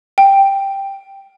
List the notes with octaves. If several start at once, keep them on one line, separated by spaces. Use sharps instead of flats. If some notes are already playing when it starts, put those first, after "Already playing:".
G5